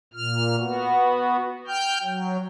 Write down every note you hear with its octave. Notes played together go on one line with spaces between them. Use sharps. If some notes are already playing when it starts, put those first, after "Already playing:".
A#2 F6
B3 F#4
G5 F6 G6
F#3